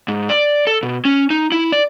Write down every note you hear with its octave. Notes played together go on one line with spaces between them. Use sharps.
G#2
D5
A4
B2
C#4
D#4
E4
D5